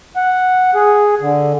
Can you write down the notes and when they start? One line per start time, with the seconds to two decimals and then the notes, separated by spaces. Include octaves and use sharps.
0.16 F#5
0.75 G#4
1.21 D3